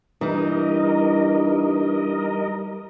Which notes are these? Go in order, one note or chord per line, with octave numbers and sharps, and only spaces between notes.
G2 E3 G3 D#4 A#4 D#5